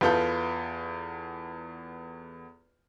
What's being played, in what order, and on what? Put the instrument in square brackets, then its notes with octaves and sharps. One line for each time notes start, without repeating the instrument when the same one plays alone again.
[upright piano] E2 B3 F4 A4 G6